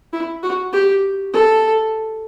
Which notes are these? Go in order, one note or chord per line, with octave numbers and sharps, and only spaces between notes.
E4
F#4
G4
A4